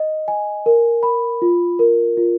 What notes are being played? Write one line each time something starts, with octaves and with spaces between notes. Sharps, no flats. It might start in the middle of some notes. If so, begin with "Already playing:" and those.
Already playing: D#5
G#5
A#4
B5
F4
A#4
F4